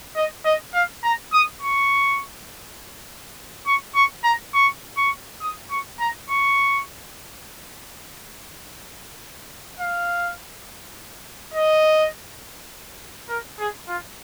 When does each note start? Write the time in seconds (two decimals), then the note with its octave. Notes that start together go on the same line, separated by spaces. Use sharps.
0.16 D#5
0.45 D#5
0.74 F5
1.04 A#5
1.33 D#6
1.62 C#6
3.67 C#6
3.95 C#6
4.24 A#5
4.54 C#6
4.97 C#6
5.42 D#6
5.71 C#6
6.00 A#5
6.30 C#6
9.80 F5
11.54 D#5
13.29 A#4
13.59 G#4
13.88 F4